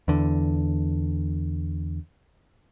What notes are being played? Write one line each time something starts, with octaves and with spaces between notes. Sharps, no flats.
E2 D3